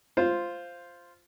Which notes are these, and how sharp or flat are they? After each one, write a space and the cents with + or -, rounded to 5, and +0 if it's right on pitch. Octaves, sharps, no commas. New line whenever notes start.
F4 -5 C5 +0